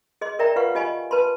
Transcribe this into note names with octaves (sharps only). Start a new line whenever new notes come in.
G#4 D#5 C6
A#4 D5 E5 G5 A#5
F4 B4 F5 F#5 C#6
F4 G4 D#5 G#5 B5 C#6
B4 A5 B5 C6